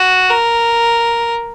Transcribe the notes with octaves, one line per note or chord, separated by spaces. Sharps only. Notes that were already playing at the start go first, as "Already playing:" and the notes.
Already playing: F#4
A#4